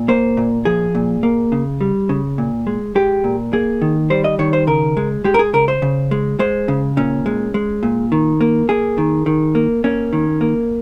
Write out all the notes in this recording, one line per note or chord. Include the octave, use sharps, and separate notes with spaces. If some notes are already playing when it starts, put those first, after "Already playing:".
Already playing: A#2
A#3 C5
A#2
F3 G#4
A#2
A#3
C#3
G3
C#3
A#2
G#3
G#3 G4
A#2
A#3 G#4
D#3
G3 C5
D#5
D#3 C#5
C5
C#3 A#4
G#3
G#3 G4
A#4
G#4
C#3 A#4
C5
C#3
G#3
G#3 C5
C#3
A#2 C#4
G#3
G#3
A#2
D#3
A#3
A#3 G#4
D#3
D#3
A#3
A#3 C#4
D#3
A#3